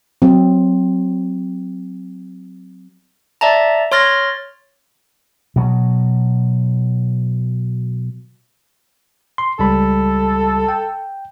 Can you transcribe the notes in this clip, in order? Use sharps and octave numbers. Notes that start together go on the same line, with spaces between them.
F#3 C4
D5 E5 A5 A#5
C#5 C6 F6 A6 A#6
B2 F#3
C6
C#2 G3 A4 B5
G5